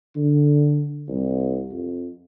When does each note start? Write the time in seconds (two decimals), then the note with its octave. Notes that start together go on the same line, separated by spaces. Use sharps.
0.16 D3
1.08 C2
1.71 F2